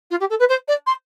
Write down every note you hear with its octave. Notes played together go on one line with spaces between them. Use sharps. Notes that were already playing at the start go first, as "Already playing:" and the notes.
F4
G4
A4
B4
C5
D5
C6